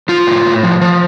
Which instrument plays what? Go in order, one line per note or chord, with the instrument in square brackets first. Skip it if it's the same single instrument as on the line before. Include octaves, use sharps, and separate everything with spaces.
[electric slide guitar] F3 F4
A2
A2
F3
F3